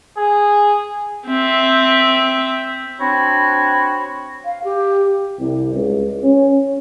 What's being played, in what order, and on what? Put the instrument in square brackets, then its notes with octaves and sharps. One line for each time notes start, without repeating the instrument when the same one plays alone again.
[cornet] G#4
[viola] C4 E5
[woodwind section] C4 D4 F#4 C#5 B5
[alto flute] F5
G4
[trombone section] C2
C#2
C#4